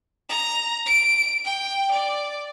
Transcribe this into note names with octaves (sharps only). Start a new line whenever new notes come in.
A#5
D7
G5
D5